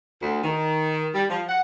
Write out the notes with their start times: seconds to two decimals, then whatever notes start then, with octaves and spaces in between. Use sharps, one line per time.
0.22 D2
0.43 D#3
1.14 G3
1.30 F3
1.48 F#5